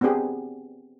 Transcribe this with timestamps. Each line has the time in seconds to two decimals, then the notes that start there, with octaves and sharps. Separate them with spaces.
0.01 B3 C4 D4 G4 G#4